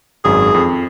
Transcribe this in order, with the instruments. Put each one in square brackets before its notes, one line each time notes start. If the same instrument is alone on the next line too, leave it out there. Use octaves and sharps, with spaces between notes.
[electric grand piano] G#1 F#2 [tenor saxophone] G#4
[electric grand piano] F2